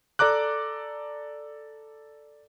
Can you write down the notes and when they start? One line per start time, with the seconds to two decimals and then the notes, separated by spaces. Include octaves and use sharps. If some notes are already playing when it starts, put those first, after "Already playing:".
0.19 A4 D5 A#5 D6 F#6